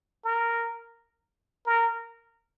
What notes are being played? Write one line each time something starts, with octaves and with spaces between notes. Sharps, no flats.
A#4
A#4